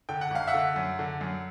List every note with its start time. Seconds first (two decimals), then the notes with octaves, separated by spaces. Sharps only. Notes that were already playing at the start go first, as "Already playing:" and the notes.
0.09 D3 G5
0.21 F#5
0.30 G#1 F5
0.47 E5 F#5
0.54 D3
0.76 F#2
0.99 D3
1.21 F#2